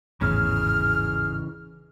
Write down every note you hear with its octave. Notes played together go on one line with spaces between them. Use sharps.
G#1 E2 A2 C#3 E3 G#4 F6